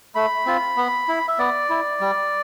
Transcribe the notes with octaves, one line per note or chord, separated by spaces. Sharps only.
A3 B5
C4 F4
B3
E4
E5
B3 D5
E4
G3